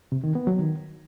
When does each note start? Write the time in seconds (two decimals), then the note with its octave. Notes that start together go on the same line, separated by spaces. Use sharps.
0.12 C3
0.24 D#3
0.35 B3
0.47 F#3
0.59 D#3